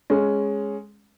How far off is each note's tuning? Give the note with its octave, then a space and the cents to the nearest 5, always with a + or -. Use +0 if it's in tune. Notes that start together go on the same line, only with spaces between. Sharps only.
G#3 +0 C#4 +0